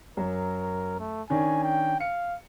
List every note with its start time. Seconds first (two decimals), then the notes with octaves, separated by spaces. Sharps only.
0.17 F#2 F#3 A#4
1.00 A3
1.30 D#3 C#4 D4 G#5
1.64 G5
2.00 F5 C#7